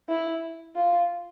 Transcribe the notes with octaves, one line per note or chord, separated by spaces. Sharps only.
E4
F4